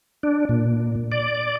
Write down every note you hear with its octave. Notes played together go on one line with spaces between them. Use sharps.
D4
A#2
D5